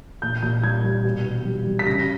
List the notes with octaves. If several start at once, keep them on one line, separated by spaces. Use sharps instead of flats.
A#2 G6
A#2 G6
G3 G#6
G3
B2
B2
G3
G3
B6
C#3 A#6